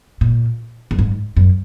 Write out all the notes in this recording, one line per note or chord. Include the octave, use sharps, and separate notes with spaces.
A#2
F#2
G#2
F#2